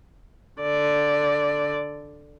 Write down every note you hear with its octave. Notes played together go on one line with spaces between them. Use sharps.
D3 D5